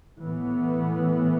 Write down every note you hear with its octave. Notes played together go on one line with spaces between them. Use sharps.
A2 E3 B3